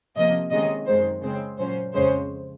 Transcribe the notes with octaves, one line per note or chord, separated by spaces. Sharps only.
C3 F3 A#3 D#5
C3 D#3 G#3 C#4 D#5
F#2 D#3 G#3 C5
C#3 G#3 C4 C5
A#2 F#3 C#4 C5
F2 C#3 G#3 C#4 C5